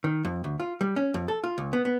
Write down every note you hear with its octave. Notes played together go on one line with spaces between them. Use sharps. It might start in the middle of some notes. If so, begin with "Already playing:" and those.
D#3
F2
D2
F4
G3
C#4
F2
A4
F4
C#2
B3
B3